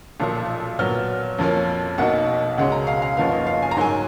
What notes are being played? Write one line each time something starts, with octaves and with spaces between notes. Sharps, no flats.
B1 A#2 F3
A#2 F#3 B3 F6
F2 F3 A#3 C#4
B1 B2 A#3 D#4 F#5
C#2 B2 G#3 C#4 F#5
A#5
F5
F5
F#1 F#2 F3 B3 D#4 F5
D#5
F5
G#5
A#5
G#2 F#3 A#3 G#5